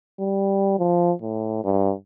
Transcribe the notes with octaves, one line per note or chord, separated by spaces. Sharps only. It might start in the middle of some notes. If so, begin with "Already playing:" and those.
G3
F3
A2
G2